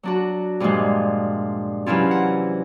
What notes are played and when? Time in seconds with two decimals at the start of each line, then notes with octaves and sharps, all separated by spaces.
0.03 F#3 D4 F#4
0.60 G2 A#2 F3 G3 G#3
1.86 C3 E3 F#3 C#4 E4 F4
2.11 F#5